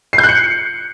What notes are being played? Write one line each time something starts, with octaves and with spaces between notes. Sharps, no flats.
C7
G6
F#6
C#7